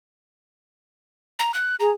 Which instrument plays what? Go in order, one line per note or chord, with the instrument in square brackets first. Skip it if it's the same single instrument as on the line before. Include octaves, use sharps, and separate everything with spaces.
[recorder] A#5
F#6
[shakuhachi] G#4 [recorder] A#5